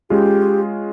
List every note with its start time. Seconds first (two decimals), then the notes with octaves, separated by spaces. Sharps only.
0.10 G#3 C#4 F4 G4 G#4